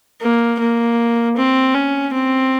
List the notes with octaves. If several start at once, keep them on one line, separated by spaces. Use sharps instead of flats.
A#3
A#3
C4
C#4
C4